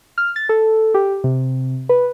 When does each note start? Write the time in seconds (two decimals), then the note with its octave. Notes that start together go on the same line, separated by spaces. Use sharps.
0.18 F6
0.36 A6
0.49 A4
0.94 G4
1.24 C3
1.89 B4